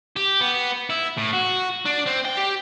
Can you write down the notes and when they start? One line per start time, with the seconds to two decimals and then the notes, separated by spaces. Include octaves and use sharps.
0.17 G4
0.41 B3
0.90 E4
1.17 A2
1.33 F#4
1.85 D4
2.06 C4
2.25 G5
2.36 G4